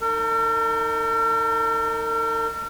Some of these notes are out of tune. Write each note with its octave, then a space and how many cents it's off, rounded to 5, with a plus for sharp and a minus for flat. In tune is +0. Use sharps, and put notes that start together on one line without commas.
D#4 +0 A#4 -45